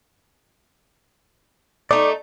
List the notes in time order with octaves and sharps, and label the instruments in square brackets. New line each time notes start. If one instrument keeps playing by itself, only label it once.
[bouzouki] A3 D#4 [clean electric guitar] D5